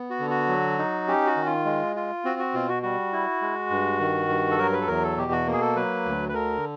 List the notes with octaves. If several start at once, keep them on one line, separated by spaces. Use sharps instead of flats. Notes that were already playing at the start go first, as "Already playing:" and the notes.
Already playing: B3
F#4
D3
F#4
F#3
D#4
C#4 G4
F#4
D#3
F4
G#3
F4
C4 F#4
F#4
B2 F4
F#4
G3 F#4
E4
G#3
G2
D#3
G2
A4
F#3 A#4
B4
A4
E2 A#4
A4
B2 G4
F#4
A#3
G#4
A4
F#3 B4
D2
B4
D3 A#4